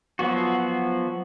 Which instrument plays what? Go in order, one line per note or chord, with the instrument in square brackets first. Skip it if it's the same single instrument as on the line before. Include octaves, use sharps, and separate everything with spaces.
[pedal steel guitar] F3 F#3 B3 F#4